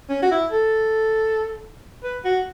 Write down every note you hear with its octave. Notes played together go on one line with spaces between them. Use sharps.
C#4
F#4
E4
A4
B4
F#4